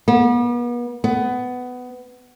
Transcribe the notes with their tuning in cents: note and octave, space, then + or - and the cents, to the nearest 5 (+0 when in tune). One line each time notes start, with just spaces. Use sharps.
B3 -40
B3 +15